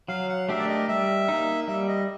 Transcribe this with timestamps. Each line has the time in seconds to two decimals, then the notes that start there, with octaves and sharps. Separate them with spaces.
0.08 F#3 F5
0.29 F#5
0.48 A3 D4 G4 A#4 E5
0.59 D5
0.69 D#5
0.88 G3 E5
1.28 A#3 D#4
1.68 G3 E5
1.88 D#5